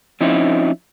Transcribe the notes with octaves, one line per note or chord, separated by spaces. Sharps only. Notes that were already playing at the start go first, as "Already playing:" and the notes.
F3 C4 C#4 D#4 E4